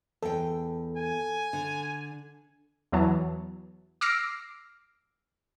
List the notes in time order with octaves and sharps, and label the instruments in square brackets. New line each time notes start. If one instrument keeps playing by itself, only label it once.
[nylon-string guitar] E2 G5 [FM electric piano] A4
[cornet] G#5
[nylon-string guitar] D3
[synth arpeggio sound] E2 E3 F#3 B3 A5
D6 E6 F6 A#6 C7 D7